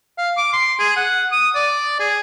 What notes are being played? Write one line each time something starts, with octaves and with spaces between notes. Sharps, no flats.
F5
D6
C6
G#4
F#5
D#6
D5
G#4